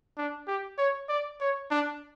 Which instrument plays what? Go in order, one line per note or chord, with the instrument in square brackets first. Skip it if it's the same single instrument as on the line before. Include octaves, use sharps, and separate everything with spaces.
[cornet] D4
G4
C#5
D5
C#5
D4